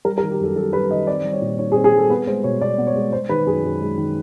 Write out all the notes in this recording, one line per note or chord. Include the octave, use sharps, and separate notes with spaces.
G3 A#4
A#4
D#3
G4
F#2 A4
F#2 A4
G3 B4
D#3 D#5
C4 D5
G3
C#5
A#2
D#4 C#5
G#4
C4
G#4
G3 A4
B3 B4
G#3 C5
B2 C#5
B2 D5
B3
C#5
G#3
G#3 C5
D#3 B4
F#2 G#4
F#2
G#3
D#3